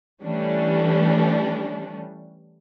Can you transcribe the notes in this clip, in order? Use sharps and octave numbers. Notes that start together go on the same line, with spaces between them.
E3 G3 A3 C#4 D4